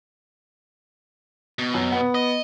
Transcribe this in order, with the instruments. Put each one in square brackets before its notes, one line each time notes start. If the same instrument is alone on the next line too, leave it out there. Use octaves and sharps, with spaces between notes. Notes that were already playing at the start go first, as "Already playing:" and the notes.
[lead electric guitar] B2
[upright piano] F#2
B3
[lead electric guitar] D#5